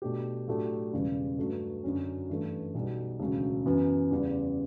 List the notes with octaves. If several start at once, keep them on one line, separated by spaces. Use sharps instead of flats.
B2 A3 D4 G4
A2 F#3 A3 D4 G4
E1 E2 C#3 G3
G2 F#3 A3
F#2 D3 F#3 C#4
G2 E3 A3
B1 B2 G3
E1 D2 C#3 F#3
F#2 E3 B3
E2 C#3 G3